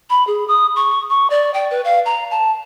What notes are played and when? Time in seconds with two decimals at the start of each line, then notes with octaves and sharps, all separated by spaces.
0.10 B5
0.27 G#4
0.48 D#6
0.76 C#6
1.10 C#6
1.30 D5
1.54 G5
1.71 B4
1.84 F5
2.06 A#5
2.31 A5